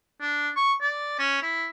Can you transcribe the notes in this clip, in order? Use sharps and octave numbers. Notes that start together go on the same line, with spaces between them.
D4
C#6
D5
C#4
E4